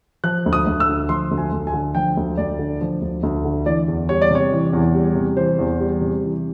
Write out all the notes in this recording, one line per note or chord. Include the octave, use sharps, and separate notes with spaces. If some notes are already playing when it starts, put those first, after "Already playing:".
F3 F#6
D2
D#6
D2
E6
D3
F3 C6
D2
G#5
D2
G#5
D3
F3 G5
D2
D2 D5
D3
F3
D2
D2
D3
E3 D5
E2
G3 C#5
D5
C3 C#5
E3
E2
G3
C3
E3 C5
E2
G3
C3
E3